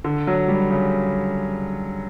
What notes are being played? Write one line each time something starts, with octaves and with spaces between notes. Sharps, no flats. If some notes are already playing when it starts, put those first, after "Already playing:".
D3
F#3
G3
C#3